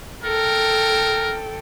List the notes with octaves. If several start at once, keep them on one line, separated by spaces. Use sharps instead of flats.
A4 A#4 G5